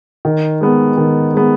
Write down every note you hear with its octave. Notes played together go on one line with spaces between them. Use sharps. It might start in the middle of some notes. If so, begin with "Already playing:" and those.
D#3
G#3 B3
D#3
G#3 B3